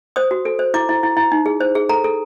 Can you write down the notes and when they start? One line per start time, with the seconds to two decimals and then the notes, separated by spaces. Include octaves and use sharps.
0.16 C5 D#6
0.31 F#4
0.45 A4
0.59 C5
0.74 E4 D6
0.89 E4
1.03 E4
1.17 E4
1.32 D#4
1.46 G#4
1.60 C5
1.75 G#4
1.89 A4 A#5
2.04 A4